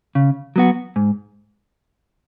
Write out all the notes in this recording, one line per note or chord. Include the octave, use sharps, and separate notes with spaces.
C#3
F#3 B3 F#4
G#2